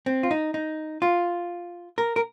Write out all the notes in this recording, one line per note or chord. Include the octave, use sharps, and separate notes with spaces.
C4
F4
D#4
D#4
F4
A#4
A#4